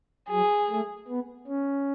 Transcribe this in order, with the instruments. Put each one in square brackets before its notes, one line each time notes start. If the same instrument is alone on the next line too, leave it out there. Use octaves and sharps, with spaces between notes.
[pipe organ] F#3 [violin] G#4
[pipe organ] A3
B3
C#4